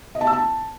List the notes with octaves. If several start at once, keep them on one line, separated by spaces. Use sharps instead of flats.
D#5
A5
E6
A5